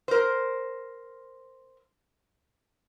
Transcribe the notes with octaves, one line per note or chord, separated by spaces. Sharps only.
A#4 C5